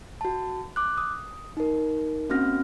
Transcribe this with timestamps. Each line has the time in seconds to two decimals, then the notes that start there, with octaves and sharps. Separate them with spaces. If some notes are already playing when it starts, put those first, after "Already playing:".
0.21 F#4 A5
0.76 D6 F#6
0.98 D#6
1.57 D#4 A#4
2.30 A#3 C4 C#4 F#4 F6 A#6